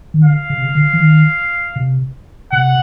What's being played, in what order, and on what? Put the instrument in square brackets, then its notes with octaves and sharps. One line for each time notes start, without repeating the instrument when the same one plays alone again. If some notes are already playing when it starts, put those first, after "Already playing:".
[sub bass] D#3
[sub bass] D3 [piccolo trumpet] F5
[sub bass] C#3
C3
C#3
D3
E3
D#3
C3
[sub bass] C3 [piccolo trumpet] F#5